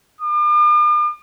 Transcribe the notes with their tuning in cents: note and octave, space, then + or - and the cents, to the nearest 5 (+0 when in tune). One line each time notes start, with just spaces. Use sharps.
D6 +45